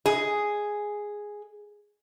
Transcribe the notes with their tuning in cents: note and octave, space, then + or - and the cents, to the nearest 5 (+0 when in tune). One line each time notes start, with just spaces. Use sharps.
G#4 +0 D#5 +0